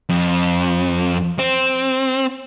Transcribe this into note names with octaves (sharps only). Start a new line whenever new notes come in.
F2
C4